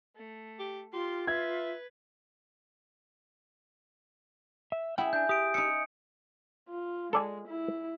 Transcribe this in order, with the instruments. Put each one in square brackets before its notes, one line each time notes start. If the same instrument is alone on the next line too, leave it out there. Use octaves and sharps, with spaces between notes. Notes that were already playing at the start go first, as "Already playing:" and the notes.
[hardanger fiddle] A3
[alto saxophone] G4
[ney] F4 [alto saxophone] G4 [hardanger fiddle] C6
[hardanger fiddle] B4 [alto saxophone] E5 [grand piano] G#6
[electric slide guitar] E5
[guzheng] E4 G#4 [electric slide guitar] F#5 G5
[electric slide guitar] D4 [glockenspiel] G#5 G6
[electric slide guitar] G4 [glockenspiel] D#6 D7
[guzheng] D#4 E5 [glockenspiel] D#6 C#7
[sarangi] F4
[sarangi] G#3 [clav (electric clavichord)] A4 D5 G#5
[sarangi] E4